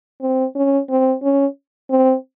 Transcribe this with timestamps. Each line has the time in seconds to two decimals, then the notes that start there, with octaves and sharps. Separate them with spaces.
0.21 C4
0.55 C#4
0.90 C4
1.22 C#4
1.90 C4